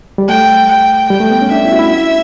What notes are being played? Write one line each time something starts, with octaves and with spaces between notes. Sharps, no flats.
G3
A3 G5
G5
G3 G5
A3
B3
C#4
D4 E5
E4
F#4
E4